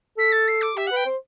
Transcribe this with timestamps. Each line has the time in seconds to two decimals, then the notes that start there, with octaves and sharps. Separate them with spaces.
0.17 A4 B6
0.32 A6
0.48 C7
0.61 D6
0.76 G4 E5
0.87 F#5
0.92 B4 G5
1.06 C5